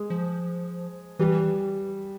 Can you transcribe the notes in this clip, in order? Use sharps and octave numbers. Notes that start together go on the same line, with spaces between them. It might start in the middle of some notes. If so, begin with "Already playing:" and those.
Already playing: G#3
F3
E3 G3